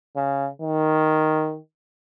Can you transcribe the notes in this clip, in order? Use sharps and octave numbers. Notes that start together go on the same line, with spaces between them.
C#3
D#3